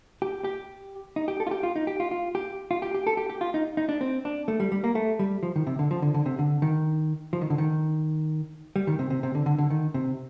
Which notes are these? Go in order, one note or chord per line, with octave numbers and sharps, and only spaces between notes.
G4
G4
D#4
G4
A4
F4
G4
F4
D#4
G4
F4
F4
G4
F4
G4
G4
A4
G4
G4
F4
D#4
D#4
D4
C4
D4
A3
G3
G3
A#3
A3
G3
F3
D#3
C3
D3
F3
D3
D3
C3
D3
D#3
F3
D#3
D3
D#3
G3
D#3
C3
C3
C3
D3
D3
D3
D#3
C3